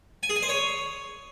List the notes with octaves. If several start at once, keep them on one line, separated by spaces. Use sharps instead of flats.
G#5
G#4
G#5
C5
C#5